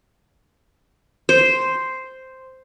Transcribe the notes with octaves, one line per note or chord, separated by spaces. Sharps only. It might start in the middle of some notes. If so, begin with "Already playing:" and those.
C5